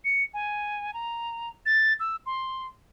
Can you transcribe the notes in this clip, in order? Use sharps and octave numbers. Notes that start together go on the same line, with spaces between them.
C#7
G#5
A#5
A6
E6
C6